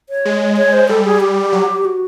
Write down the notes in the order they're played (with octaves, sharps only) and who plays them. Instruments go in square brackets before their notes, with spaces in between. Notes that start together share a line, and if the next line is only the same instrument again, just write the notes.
[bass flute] C#5
[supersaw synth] G#3
[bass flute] C#5
C5
[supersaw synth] G3 [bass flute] A4
[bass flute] G#4
G4
[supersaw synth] F#3
[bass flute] F#4